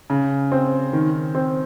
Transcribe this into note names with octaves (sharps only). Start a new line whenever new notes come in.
C#3
C4
D#3
C4